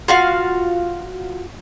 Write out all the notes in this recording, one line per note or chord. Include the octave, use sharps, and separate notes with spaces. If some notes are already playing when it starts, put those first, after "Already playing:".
F4 F#4 F5